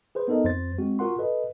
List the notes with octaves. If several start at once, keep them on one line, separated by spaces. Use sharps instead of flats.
G#4 B4 C5
B3 D#4 A4 A#4 D#5
F2 C5 A6
G#3 C4 F#4
F4 F#4 A#4 F#5 C6
A4 B4 D#5